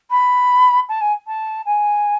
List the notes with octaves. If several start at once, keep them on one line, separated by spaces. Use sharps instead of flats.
B5
A5
G#5
A5
G#5